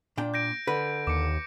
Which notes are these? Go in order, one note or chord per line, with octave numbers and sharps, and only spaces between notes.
A#2 D4 G5
G6 A#6 D7
D3 B4
D#2 D6 C#7